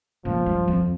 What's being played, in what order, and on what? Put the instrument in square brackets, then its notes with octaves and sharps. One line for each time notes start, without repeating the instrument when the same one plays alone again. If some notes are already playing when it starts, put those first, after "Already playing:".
[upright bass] A#2 [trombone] F3
[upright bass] G2
F2